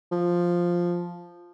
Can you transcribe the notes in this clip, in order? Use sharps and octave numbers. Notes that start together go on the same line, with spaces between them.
F3